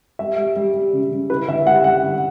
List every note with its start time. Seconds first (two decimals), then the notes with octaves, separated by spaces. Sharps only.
0.19 G3 E5
0.37 G3
0.56 G3
0.74 G3
0.93 C#3
1.11 C#3
1.30 E4 B4
1.48 D3 E5
1.66 G3 F#5
1.84 G3 F#5
2.03 D3